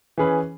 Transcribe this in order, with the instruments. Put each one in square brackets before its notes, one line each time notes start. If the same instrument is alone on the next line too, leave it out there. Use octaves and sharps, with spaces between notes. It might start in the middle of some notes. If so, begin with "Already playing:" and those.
[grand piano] E3 C#4 G#4 B4